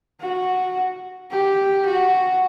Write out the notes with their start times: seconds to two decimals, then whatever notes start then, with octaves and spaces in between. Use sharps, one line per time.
0.21 F#4
1.31 G4
1.86 F#4